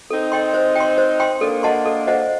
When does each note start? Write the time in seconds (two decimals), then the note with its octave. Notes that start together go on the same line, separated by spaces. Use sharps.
0.10 C4 D#4 A4
0.32 D#5 G5 C6
0.54 C5
0.76 G5 C6
0.98 C5
1.20 G5 C6
1.41 A#3 D4 A4
1.63 D#5 F#5 A5 C6
1.86 A4
2.07 C5 D#5 F#5